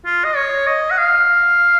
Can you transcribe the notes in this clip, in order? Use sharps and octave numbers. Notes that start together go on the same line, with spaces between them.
F4
D#5
C#5
D#5
F#5
F5